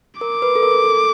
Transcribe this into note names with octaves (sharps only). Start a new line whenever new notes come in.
A#4 D6
B4
A4
A#4
A4